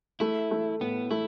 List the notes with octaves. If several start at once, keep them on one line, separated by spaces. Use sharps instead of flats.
A3 E4
A3
A2 B3
A3 E4